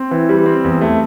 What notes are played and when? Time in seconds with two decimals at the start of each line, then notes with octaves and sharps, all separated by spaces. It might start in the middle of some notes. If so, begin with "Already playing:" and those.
Already playing: C4
0.11 E3
0.29 G3
0.46 C4
0.64 E2
0.81 A3